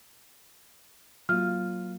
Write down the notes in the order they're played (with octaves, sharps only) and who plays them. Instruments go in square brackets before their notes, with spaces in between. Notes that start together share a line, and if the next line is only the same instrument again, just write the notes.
[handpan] F#3 A#3 [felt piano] F4 [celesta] F6